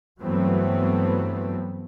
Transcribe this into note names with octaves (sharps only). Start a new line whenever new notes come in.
G2 E3 F#3 A3 B3 C4